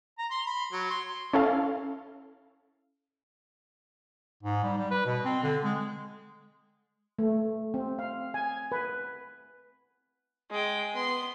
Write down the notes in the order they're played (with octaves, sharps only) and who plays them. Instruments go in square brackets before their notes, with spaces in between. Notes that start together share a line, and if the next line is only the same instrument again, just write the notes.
[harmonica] A#5
C6
B5
F#3
C6
[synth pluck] C#4 E4 A4 F5
[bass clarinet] G#2
G3
G3
B4
B2
C4
D3
G#3
[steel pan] A3
C4
F5
G#5
B4
[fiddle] G#3 G5
B3 C6